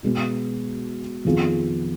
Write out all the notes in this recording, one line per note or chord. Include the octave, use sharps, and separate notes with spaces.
B2 G#3 B3
F2 D#3 B3 F4 G#4